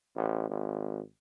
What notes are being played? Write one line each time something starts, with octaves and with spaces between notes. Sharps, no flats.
A1
G#1